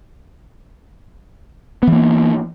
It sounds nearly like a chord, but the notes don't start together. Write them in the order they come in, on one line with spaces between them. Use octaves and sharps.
B3 E3 A#3